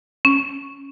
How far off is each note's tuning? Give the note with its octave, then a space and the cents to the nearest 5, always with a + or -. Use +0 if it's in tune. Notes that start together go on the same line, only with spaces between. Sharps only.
C#4 -10